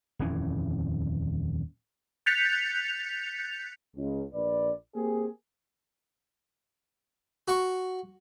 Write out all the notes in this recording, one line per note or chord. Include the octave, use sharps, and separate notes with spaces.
D#1 F2 E3 C#4
F#6 G6 A6 B6 C#7 F7
C#2
A#1 B4 D5
A#3 C4 G4 G#4
F#4 C#6